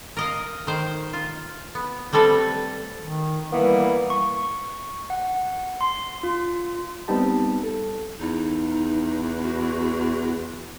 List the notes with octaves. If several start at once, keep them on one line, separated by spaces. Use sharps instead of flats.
A#4 D#5 F5
D#3 C5
F4
B3
G3 A3 C4 A4 B4
D#3
E3 G3 A#3 B3
C#6
F#5
C6
F4
G3 B3 C4 D#4 G4 A5
A4
E2 D#4
F#4